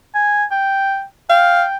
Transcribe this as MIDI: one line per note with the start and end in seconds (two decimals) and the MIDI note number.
0.15 0.44 80
0.51 1.03 79
1.30 1.65 77
1.30 1.77 79